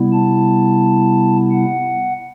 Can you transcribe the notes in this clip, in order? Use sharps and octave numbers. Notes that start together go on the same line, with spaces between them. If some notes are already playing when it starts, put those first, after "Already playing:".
Already playing: C3 G3 B3 E4
A5
F#5